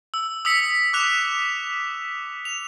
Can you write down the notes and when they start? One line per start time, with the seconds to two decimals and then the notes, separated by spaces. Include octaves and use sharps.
0.14 E6
0.45 D#6 E6 B6 C#7
0.93 D6 F#6 F7
2.45 F7